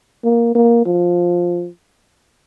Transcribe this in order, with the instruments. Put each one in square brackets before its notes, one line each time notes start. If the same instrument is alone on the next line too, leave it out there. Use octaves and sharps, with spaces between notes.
[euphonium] A#3
A#3
F3